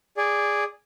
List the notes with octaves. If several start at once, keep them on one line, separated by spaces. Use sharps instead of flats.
G#4 D5